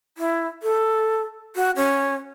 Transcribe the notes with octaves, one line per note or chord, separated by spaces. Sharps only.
E4
A4
F#4
C#4